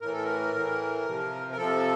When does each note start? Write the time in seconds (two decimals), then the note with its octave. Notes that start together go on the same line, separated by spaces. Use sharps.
0.01 A2 E3 A#4
0.13 A4
0.24 A#4
0.54 A2 E3
1.05 C3 F3
1.51 A#4
1.57 C3 F3 A4